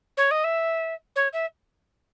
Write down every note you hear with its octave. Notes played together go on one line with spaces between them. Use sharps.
C#5
D#5
E5
C#5
E5